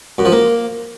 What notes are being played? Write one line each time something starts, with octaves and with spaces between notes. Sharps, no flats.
F#2
F3
A#3